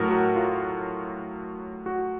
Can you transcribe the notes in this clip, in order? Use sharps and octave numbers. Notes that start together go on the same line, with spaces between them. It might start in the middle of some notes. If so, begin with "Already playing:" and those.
Already playing: A2 F#3 F#4 A#4
F#4
F4
F#4